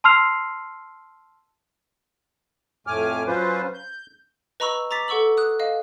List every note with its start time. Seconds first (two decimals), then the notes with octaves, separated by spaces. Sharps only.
0.04 A5 C6 E6 F6 C7 F7
2.87 F2 A2 A3 G#5 D6 F6
3.27 F#3 C#4 F4 B4 C5
3.74 G6
4.60 B4 D#5 A#5 B5 C#6 E6
4.91 A#5 D6 A6 B6
5.08 A4 F#5 C#6 E6 F#7
5.37 D#6 F#6
5.59 D#5 F5